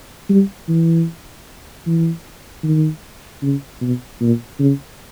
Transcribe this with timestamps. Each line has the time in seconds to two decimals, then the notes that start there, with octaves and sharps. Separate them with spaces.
0.29 G3
0.68 E3
1.86 E3
2.63 D#3
3.42 C#3
3.81 B2
4.21 A#2
4.59 C#3